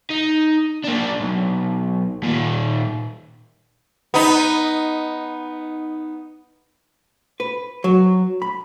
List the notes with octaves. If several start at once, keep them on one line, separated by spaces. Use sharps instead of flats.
D#4
A#3 D4
B1
A#2 D#3
B3 D#4
B4
F#3
B5